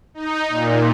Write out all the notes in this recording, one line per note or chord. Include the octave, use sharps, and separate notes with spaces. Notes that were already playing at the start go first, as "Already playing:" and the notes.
D#4
A#2